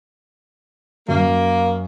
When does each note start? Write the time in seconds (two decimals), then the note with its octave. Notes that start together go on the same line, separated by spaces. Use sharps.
1.09 F#2 A#3